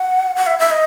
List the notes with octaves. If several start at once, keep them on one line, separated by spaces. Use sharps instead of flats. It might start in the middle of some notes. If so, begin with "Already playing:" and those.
Already playing: F#5
F#5
E5
E5
D#5